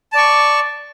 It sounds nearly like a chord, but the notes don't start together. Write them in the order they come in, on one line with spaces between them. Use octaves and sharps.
A5 D5 C#6